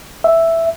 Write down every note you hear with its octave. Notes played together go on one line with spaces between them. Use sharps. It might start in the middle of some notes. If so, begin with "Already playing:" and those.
E5